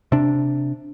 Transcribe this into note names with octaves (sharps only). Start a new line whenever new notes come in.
C3 D4